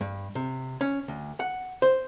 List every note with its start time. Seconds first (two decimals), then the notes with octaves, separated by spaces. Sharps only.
0.01 G2
0.35 C3
0.81 C#4
1.08 D2
1.40 F#5
1.82 C5